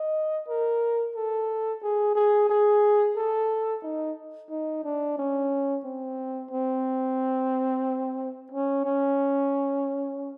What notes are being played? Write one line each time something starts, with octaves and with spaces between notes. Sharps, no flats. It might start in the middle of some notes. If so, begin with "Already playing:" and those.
Already playing: D#5
A#4
A4
G#4
G#4
G#4
A4
D#4
D#4
D4
C#4
C4
C4
C#4
C#4